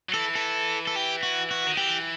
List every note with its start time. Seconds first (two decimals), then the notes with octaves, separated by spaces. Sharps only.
0.09 F#3
0.14 E3 A4
0.35 A4
0.87 A4
0.96 G4
1.23 F#4
1.51 F#4
1.67 D#3
1.77 E3 G4